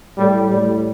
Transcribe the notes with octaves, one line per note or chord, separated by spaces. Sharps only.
A2 G3
A2 G3